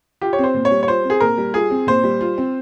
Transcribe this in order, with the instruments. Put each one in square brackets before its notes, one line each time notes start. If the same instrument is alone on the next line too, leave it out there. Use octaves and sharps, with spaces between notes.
[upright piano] F4 [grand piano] G4
[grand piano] C#5
[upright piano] C4
[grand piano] C5
[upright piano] A#2
[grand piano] C#5
[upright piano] G3
[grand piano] C#5
[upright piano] F4 [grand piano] C5
[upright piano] C4
[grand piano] G#4
[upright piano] A#2 [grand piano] A#4
[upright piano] G3
[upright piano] F4 [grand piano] G#4
[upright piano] C4
[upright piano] A#2 [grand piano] C5
[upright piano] G3
F4
C4